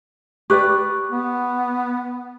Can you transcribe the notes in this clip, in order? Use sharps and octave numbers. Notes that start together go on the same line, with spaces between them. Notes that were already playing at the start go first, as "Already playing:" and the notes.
G4 B4 D5 C#6 F#6
B3